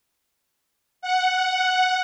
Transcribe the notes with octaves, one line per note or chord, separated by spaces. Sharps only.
F#5